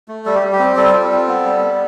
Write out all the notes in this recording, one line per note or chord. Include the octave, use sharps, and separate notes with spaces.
A3
G3 A4
G4
G3
G4
C4
G3 A4
F4
C4
B3
G3
B3